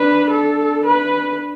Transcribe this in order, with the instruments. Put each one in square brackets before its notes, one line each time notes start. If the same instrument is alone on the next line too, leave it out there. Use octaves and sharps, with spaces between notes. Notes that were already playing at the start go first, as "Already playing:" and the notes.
Already playing: [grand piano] D4 [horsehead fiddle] B4
[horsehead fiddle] A4
B4